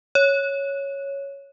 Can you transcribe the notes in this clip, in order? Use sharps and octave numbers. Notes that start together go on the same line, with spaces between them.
C#5